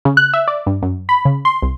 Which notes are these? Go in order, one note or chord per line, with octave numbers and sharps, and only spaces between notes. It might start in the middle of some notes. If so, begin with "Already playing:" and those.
C#3
F#6
E5
D5
G2
F#2
B5
C#3
C6
C2